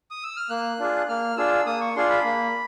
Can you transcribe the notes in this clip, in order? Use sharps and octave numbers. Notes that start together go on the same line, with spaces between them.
D#6
E6
F6
A#3 F#6
D4 F4 G#4
A#3 F6
D4 F4 G#4 E6
A#3 D#6
C#6
D4 F4 G#4 C6
B5
A#3